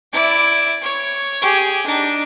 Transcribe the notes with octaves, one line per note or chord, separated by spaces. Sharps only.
E4 D5
C#5
G4 G#4
D4 D#4